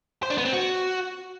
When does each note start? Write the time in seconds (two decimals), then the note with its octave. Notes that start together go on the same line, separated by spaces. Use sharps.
0.23 C5
0.30 D4
0.38 B3
0.45 C4
0.53 F#4